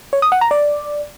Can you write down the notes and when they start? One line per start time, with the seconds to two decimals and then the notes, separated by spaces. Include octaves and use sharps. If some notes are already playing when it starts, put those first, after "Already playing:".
0.13 C#5
0.22 D#6
0.32 F#5
0.41 A#5
0.51 D5